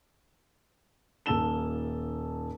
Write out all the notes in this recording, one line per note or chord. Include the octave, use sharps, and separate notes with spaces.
D#1 A#3 A5 E6 E7 G7